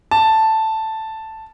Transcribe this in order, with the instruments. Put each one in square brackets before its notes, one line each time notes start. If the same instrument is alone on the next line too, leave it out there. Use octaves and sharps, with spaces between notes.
[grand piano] A5